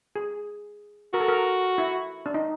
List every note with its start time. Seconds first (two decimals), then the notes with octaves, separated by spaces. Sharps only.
0.16 G#4
1.13 F#4 A#4
1.20 A4
1.28 A#4
1.78 E4
2.26 D4
2.34 D#4